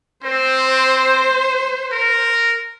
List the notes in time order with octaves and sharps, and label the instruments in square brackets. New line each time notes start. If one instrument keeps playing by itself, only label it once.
[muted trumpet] C4 [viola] C5
[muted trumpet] A#4